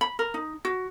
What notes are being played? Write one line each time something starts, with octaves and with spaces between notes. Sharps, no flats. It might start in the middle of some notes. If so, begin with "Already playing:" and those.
B5
A#4
D#4
F#4